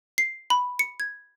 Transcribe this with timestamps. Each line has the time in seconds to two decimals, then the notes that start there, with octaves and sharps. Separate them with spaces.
0.18 C7
0.50 B5
0.79 C#7
1.00 G#6